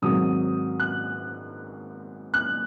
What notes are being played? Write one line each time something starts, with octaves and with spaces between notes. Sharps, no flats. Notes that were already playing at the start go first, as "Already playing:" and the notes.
G#2 D#3 F#3 C4 D#6
F#6
F#6